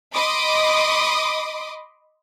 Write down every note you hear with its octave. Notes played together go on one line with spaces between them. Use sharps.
D#5 B5 C6 D6 D#6